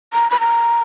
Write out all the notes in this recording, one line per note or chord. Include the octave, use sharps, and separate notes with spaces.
A#5
B5
A#5